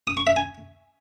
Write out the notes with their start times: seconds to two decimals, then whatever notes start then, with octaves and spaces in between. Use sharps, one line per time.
0.07 D#6
0.17 C#6
0.27 E5
0.36 G#5